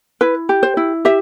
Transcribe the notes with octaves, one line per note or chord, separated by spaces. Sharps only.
E4 B4
G4
C5
E4
G4 E5